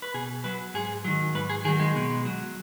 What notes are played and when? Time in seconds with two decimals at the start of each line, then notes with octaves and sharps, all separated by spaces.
0.02 B4
0.14 B2 G#4
0.44 F#3 B4
0.74 G#2 G#4
1.04 D#3 F#3
1.35 G#2 B4
1.49 G#4
1.65 D#3 G#4
1.68 F#3
1.80 G#3
1.95 B2
2.25 F#3